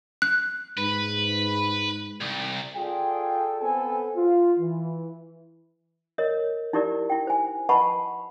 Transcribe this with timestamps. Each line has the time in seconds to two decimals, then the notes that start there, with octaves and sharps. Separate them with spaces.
0.22 F#6
0.77 G#2 B4
2.21 C2
2.76 F4 G#4 A4 D5 G5
3.62 B3 C4 A4 C5 G#5
4.16 F4
4.59 E3
6.18 A#4 C#5 D#5
6.73 D#4 E4 G4 A#4 D5
7.10 E4 G5
7.27 C5 G#5
7.69 B4 D#5 F#5 A5 B5 C#6